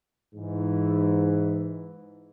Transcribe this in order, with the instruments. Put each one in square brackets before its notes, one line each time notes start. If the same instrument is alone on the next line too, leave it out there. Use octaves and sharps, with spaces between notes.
[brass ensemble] G#2 E3